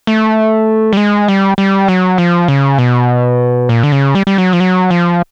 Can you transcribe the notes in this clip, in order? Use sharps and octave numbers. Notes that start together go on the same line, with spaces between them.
A3
G3
G#3
G3
G3
F#3
F3
C#3
B2
A#2
D3
C#3
G3
G3
F#3
F3
F#3
F3